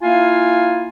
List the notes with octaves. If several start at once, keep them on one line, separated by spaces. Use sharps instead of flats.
A#3 E4 F4 F5 G#5